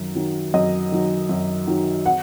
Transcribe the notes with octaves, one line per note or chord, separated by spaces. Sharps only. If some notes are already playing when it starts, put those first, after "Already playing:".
Already playing: F#2 D#3 F#3
D#3 F#3
F#2 D#5
D#3 F#3
F#2
D#3 F#3
F#5